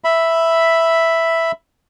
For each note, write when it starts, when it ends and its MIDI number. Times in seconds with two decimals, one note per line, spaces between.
0.04 1.52 76
0.04 1.52 83